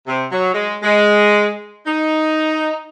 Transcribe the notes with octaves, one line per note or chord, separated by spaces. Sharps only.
C3
F#3
G#3
G#3
D#4